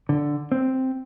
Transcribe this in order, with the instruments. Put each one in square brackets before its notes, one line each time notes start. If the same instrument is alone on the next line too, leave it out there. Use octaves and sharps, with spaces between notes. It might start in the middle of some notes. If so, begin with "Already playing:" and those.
[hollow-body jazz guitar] D3
C4